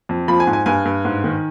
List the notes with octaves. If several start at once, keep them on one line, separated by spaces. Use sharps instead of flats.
F2
F3 B5
G#5
G#2
G#5
G2 G#5
G2
G#2
D#3